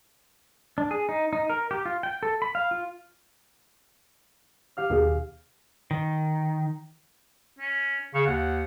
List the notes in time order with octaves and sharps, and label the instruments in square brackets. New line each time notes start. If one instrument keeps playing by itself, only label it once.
[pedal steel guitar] D4
G#4
D#4
D#4
A#4
G4
F4
G5
A4
B5
F5
F4
[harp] G4 F5 F6
[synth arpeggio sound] D#2 B2 G#4
[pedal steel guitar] D#3
[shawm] C#4
[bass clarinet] C#3 [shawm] C#6
[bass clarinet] D#2 [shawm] F#5